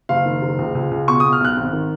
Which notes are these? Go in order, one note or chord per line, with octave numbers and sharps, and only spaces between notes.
F#1 F5
D#3
F#1
C#2
C#2
C#2
B2 C#6
B2 D#6
F6
B1 F#6
G#1
D#3